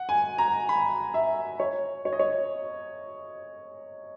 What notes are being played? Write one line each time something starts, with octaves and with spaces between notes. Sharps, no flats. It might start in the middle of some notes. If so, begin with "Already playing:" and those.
Already playing: F#5
G#5
A#5
B5
E5
C#5
C#5
D#5
C#5